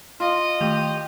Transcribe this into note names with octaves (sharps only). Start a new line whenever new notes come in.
F4 D#5
D#3 A3 G4 F7